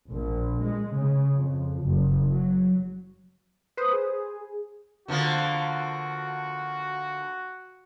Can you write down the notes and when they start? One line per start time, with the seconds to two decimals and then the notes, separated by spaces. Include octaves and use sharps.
0.11 A#1
0.62 G#3
0.95 C#3
1.36 F2
1.86 F#1
2.30 F#3
3.77 B4 C5 D#6
3.93 G#4
5.08 D3 F3 A#3 F#4